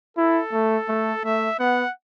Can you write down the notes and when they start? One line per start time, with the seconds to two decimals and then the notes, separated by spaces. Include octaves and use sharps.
0.17 E4 A4
0.52 A3
0.88 A3
1.24 A3 E5
1.59 B3 F#5